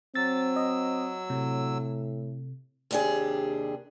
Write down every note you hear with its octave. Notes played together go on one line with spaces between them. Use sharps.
F#3 C4 E6 A6
D#5
A2 C3
D#2 C3 D4 G4 G#4